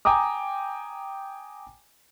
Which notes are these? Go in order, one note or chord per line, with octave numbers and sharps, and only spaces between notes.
G5 G#5 A#5 D6 D#6